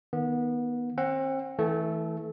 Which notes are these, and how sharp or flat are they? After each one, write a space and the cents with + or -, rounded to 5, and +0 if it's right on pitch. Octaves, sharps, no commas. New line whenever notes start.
D#3 +0 B3 -25
C4 +35 F#5 +5
E3 -20 A3 +0 A4 -30